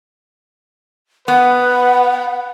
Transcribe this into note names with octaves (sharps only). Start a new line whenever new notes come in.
B3 B4 F#5